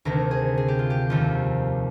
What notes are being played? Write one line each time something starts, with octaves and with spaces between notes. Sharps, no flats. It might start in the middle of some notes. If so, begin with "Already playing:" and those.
D2 C3 D#3 A#4
G#4
G#4
G4
F4
G4
F1 D#2 D#3 F4